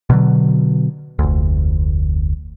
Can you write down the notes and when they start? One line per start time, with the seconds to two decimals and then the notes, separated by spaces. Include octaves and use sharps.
0.10 B2 D3 F#3
1.19 F1 D2